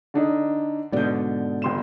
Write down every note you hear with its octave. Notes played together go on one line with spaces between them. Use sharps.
D3 D4 D#4
G#2 B2 D3 D5 G6
G1 C6 E7